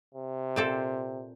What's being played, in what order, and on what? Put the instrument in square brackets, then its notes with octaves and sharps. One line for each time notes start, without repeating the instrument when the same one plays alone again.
[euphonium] C3
[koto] A#2 C4 A4